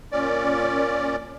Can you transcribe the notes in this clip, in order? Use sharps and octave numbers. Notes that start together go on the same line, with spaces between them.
A#2 C#4 D5